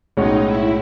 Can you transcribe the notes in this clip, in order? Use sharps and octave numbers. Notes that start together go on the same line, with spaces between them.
B1 A2 G#3 C#4 D#4 F#4
E4